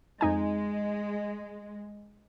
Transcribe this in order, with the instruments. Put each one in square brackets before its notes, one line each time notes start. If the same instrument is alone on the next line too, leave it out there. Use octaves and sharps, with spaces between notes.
[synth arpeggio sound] F2 D#4 G#5 [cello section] G#3